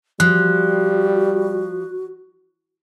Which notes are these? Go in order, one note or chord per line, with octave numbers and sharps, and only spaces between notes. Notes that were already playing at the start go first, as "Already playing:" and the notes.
F3 G3 F#4 F#6